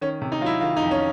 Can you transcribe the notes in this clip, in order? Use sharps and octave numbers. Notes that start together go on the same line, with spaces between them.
D#3 C#4
C3
D#4
F#3 E4 F4
D#3 F4
D#4
F2
C#4